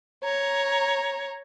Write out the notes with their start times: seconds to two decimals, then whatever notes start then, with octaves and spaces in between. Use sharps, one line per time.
0.24 C#5 A#5